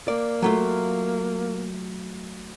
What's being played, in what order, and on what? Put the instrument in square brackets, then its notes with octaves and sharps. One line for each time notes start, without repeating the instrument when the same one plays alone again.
[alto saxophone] A#3 [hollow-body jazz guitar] D5
[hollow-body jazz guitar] F#3 A3 F4